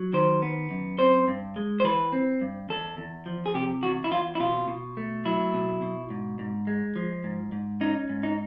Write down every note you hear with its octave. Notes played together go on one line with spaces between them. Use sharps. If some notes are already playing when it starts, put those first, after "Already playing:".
Already playing: F#3
D#3 C5
B3
F#2
C4 C5
G2
G#3
C5
E3 B4
C4
G2
E2 A4
E2
F3
G#4
C3 G4
E2 F#4
E4
E2 F4
E4
B2 F4
B2
A3
F#3 E4
B2
B2
G#2
G#2
G#3
F3
G#2
G#2
C#4 D#4
G#2
D#4